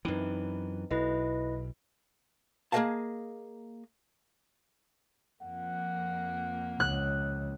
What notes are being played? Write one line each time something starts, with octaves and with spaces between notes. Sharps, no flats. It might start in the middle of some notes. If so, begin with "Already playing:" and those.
F#2 E3 C4 D#4 B4
B1 E4 B4 D#5
A#3 G#4 B4 D#5 F5 A5
F2 A#3 F#5
C#2 F#6